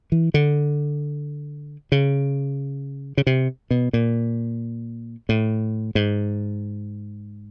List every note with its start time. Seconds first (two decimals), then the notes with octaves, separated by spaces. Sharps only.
0.12 E3
0.34 D3
1.92 C#3
3.17 C#3
3.27 C3
3.71 B2
3.93 A#2
5.29 A2
5.95 G#2